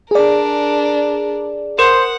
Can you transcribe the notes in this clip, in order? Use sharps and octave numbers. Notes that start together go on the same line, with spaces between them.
D4 G#4 A#4 D5
A#4 C5 F#5